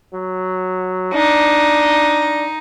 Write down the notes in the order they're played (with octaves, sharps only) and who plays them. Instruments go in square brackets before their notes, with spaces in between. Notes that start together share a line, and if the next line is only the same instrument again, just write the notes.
[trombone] F#3
[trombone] D4 [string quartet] D#4